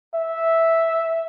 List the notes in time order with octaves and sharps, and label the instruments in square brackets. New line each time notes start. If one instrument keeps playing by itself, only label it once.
[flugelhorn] E5